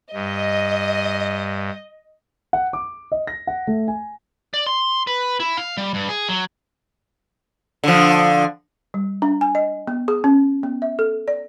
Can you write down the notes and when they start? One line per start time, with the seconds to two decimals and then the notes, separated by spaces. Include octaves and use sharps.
0.14 G2 D#5
2.53 F#5
2.73 D6
3.12 D#5
3.27 A#6
3.47 F#5
3.67 A3
3.88 G#5
4.54 D5
4.67 C6
5.07 B4
5.40 E4
5.57 F5
5.77 G3
5.94 G2
6.09 G#4
6.29 F#3
7.84 D3 F3
8.94 G3
9.22 D4
9.41 G#5
9.55 D#5
9.87 B3
10.08 G#4
10.24 C#4
10.63 B3
10.82 E5
10.99 A4
11.28 D5